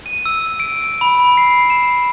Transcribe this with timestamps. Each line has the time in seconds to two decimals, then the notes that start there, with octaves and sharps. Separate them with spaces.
0.06 D#7
0.26 E6
0.60 D7
0.82 D7
1.01 B5
1.37 C7
1.70 E7